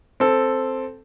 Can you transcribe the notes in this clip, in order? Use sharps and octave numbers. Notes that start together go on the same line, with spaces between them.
C4 A4